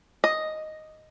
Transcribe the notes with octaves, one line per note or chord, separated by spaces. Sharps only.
D#5